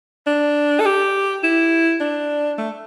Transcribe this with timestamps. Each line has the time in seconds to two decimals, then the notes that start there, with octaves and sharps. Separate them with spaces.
0.27 D4
0.80 A4
0.86 G4
1.44 E4
2.01 D4
2.58 A3